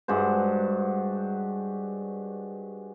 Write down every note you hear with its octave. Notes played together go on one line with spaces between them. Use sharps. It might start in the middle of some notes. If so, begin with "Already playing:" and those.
G2 G#3 F#4 C5